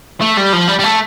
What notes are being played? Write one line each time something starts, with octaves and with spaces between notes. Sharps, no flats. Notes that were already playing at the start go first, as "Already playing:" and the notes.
A3
G3
F3
G3
G3
A3